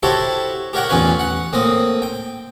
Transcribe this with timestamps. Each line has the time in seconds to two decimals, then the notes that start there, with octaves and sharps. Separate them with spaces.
0.03 E4 F#4 G4 A4 C5 C#5
0.73 G4 A#4 C#5 F#5 G5
0.89 A1 E2 C#4 F4 B4 C#5
1.19 F#5
1.53 A2 A#3 C4 D#6
2.02 G5